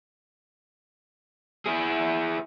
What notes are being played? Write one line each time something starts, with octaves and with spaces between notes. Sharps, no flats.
E4 G#4